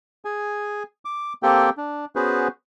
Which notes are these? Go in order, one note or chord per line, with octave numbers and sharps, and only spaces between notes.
G#4 G#5
D6
A#3 C4 G4 A4 G5
D4
B3 C#4 F#4 G#4 B4 C5